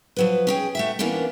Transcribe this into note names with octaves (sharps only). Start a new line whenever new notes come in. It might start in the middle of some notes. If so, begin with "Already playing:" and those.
F3 F#3 B4
C#4 G#4 G5
A3 F#4 E5
D#2 E3 A#3 B3 C#4 D4